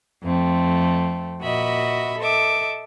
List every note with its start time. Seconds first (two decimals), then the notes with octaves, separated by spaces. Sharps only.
0.23 F2 A3 C4
1.41 A#2 F#4 D#5 E5 B5
2.18 A4 D#5 E5 D6